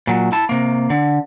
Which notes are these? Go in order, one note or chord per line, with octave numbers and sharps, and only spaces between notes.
A#2 F#3
E4 A5
C3 A#3
D3